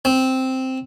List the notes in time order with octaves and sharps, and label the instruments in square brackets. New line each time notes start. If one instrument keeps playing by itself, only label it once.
[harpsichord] C4